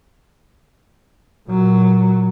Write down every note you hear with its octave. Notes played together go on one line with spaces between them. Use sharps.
A#2 F#3